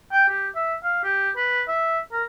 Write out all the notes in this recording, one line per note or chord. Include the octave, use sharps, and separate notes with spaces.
G5
G4
E5
F5
G4
B4
E5
A#4